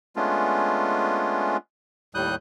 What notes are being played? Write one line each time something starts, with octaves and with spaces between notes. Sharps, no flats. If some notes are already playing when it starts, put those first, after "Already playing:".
G#3 A3 B3 C#4 D4 F4
D#2 A2 G3 D#6 F#6 G6